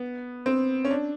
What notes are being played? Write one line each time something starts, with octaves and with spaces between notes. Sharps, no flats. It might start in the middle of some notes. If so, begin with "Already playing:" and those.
Already playing: B3
C4
C#4
D4